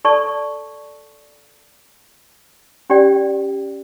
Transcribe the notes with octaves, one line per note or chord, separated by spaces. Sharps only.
A4 D5 A5 C#6
C#4 G4 D5 G5